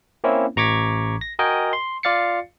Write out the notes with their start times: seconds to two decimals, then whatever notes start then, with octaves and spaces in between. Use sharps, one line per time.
0.24 A#3 C4 C#4 E4
0.56 A1 A#5 C#6 D6 G#6 B6
1.21 A#6
1.39 F#4 A#4 D#5 G5 G#5
1.73 C6
2.03 F4 D5 F5 A6 C7 C#7